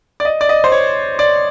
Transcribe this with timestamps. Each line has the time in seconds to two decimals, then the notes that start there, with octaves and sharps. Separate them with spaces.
0.20 D5
0.25 D#5
0.41 D5
0.49 D#5
0.64 C5
0.72 C#5
1.19 D5